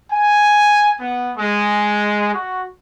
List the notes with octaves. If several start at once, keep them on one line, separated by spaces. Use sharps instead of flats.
G#5
B3
G#3
F#4